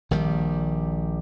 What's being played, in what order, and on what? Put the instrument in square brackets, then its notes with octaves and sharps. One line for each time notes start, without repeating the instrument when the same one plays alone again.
[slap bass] A#1 D#3 G3